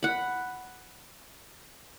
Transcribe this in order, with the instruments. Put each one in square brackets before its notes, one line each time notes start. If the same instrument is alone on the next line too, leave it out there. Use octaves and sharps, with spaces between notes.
[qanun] F#5 B5